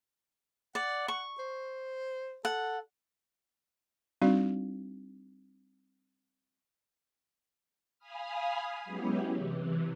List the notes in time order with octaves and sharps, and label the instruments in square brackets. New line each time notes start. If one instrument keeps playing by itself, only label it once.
[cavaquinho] D5 [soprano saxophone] F#5
[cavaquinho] C#6
[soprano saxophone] C5
[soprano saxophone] A4 [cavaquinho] F#5
[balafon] G3 C4 D4 D#4 F#4 D5
[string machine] F5 G#5 B5 D#6 F6
F#3 G#3 B3 C#4 E4 G4
C3 E3